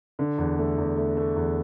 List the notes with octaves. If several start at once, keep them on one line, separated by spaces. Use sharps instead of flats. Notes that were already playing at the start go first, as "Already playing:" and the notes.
D3
E2
A3
E2
A3
A3
E2